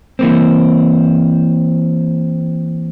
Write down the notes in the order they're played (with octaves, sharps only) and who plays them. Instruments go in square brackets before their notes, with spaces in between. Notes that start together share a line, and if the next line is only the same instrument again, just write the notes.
[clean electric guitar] E3 A#3 C4